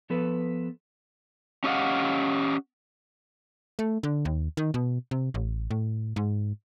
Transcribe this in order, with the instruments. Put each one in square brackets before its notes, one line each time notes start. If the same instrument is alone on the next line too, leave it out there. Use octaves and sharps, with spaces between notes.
[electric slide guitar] F3 B3 A4 B4
C#4 G4 D#5 F5 F#5
[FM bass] A3
D3
D#2
D#3
B2
C3
A1
A2
G#2